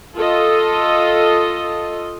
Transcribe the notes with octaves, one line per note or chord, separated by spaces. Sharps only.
F4 A4 D#5